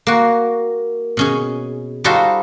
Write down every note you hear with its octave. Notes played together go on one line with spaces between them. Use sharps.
A#3 F#4
B2 C#4 G#4
G3 D#4 F4 F#4 A4 C5